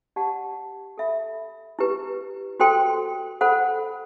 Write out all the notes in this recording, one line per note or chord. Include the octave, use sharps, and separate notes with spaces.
G4 D5 F#5 A5
A4 E5 B5
E4 G4 B4
F#4 A4 C5 G5 C6
A4 C5 F#5 B5